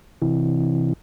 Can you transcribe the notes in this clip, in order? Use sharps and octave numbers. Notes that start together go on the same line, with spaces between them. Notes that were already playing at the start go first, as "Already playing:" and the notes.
C3 E3